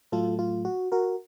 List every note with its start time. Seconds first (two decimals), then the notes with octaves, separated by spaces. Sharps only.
0.12 A2 F#3 A3 F4 A4
0.39 F4
0.65 F#4
0.92 F#4 A#4